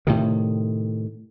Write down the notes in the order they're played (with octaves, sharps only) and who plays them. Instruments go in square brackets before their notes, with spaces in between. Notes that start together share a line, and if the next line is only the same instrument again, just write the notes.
[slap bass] A2 C3 D#3